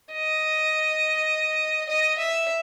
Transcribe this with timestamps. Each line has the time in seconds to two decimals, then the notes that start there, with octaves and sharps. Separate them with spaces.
0.12 D#5
1.89 D#5
2.18 E5